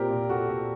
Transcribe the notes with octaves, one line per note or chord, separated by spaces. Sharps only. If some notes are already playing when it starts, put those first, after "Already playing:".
Already playing: A#2 C4 G4 A#4
A#2
A#2 F#4 A4
A#2